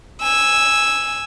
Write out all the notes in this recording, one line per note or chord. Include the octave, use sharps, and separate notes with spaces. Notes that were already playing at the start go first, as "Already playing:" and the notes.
G#5 E6